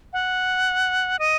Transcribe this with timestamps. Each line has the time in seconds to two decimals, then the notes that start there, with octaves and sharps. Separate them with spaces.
0.13 F#5
1.19 D#5